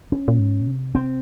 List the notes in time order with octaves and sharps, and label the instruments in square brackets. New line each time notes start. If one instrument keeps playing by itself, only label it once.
[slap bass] C#4
[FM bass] A#2
G#2
A#2
C3
[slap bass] C4